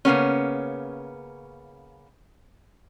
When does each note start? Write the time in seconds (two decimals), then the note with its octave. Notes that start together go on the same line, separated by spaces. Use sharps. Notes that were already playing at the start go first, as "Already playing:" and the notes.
0.05 C#3 A#3 B3 C#4